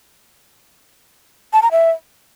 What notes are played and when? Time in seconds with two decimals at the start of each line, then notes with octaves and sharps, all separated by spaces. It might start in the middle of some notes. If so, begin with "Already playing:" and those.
1.53 A5
1.62 A#5
1.72 E5